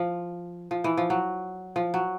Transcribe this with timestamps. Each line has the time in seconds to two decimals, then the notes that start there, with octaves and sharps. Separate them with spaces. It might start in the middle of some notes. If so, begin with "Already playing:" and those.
Already playing: F3
0.71 F3
0.84 E3
0.97 F3
1.10 F#3
1.76 F3
1.94 F#3